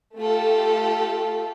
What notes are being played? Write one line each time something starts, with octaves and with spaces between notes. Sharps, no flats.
A3 F4 G4 A4